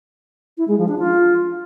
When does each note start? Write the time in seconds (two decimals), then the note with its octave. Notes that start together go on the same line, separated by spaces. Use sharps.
0.58 E4
0.68 G#3
0.78 F3
0.88 D4
0.99 F4